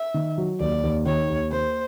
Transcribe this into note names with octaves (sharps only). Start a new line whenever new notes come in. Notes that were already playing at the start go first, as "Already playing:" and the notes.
Already playing: E5
D#3
F#3
D#2 D5
D#2
D#3 C#5
D#2
A#3 C5